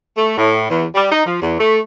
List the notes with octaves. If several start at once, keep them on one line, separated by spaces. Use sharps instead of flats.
A3
A2
E2
G3
D#4
F3
E2
A3